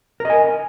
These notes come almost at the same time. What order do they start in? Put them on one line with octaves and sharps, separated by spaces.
A#4 D#5 G#5